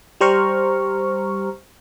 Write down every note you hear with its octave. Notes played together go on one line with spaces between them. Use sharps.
G3 G4 C5 A#5 C#6 F6